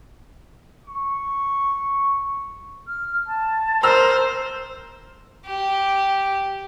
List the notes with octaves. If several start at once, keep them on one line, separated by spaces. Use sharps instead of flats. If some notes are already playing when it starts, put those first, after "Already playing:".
C#6
F6
A5
A#4 C5 A#5 E6 F6
G4